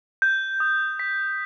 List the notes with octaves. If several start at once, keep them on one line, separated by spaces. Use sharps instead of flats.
G6
D#6
B6